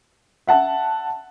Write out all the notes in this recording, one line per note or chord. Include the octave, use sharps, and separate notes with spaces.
E5 F#5 A5